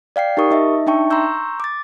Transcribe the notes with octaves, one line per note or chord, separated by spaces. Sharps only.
D5 F5 G5 C7
D#4 G4 A#4 C#6 D#6
D#4 D#5 E5
D4 D#4 E5 G5 A5 C#6
A#5 C6 C#6 E6 G6
D6 A6